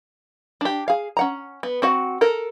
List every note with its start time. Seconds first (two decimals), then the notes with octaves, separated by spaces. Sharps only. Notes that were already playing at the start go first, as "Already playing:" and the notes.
0.61 D4 G4
0.88 G#4 F5
1.17 C#4 F#5 A#5
1.63 B3
1.82 C4 F#4 F#5
2.21 A4 A#4